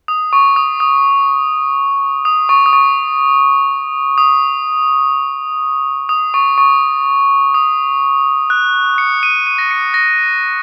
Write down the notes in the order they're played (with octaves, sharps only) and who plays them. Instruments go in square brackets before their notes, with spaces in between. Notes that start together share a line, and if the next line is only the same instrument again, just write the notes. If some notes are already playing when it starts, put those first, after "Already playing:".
[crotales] D#6
C#6
D#6
D#6
D#6
C#6
D#6
C#6
D#6
D#6
C#6
C#6
D#6
F#6
C#7
D#7
D#7
A#6
C#7
A#6